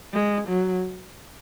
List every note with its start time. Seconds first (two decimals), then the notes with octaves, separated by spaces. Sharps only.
0.13 G#3
0.48 F#3